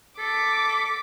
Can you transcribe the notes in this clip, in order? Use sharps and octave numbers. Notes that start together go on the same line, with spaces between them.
A4 D6 B6